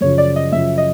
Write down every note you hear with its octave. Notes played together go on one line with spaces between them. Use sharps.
F#2 C#3 F3 C#5
D5
D#5
F#2 C#3 F3 E5
D#5